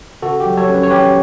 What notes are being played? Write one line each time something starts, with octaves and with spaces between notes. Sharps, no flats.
C#3 F#4 A4
G4
F#3
A4 C#5
C#4
B4
C#5
C#4 G4 B4